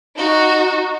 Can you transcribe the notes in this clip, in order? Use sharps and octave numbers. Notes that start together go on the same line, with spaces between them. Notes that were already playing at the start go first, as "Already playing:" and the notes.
D#4 F#4